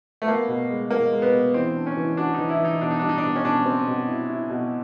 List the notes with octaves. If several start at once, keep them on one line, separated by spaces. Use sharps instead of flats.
A3
A#3 B3
B2
G#3
B2 A#3
G#3
B3
B2
E3 C4
D4
C#4
E3
D4 F#4
D#4
E3
E4
E3
D#4
B2 D4
D#4
G3 D4
D#4
D4
B2
C#4
B2 D4
C4
B2
E4
E4
B2